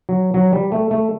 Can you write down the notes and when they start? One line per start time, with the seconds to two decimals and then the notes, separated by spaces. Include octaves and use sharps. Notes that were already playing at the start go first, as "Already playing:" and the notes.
0.09 F#3
0.34 F#3
0.53 G3
0.72 A3
0.91 A3